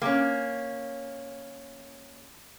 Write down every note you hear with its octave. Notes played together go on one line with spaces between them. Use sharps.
A#3 C#4